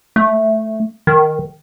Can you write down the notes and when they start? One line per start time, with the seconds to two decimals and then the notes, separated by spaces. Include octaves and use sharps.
0.16 A3
1.07 D#3